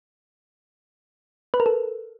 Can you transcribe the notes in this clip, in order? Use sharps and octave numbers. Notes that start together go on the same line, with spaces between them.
B4
A#4
A4